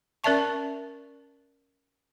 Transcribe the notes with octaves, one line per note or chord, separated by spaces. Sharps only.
C#4 A#4 D5 E5 A5 C#6